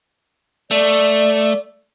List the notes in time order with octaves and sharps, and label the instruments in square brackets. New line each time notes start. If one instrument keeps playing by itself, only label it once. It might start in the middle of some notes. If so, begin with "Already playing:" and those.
[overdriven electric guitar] A3 [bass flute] D5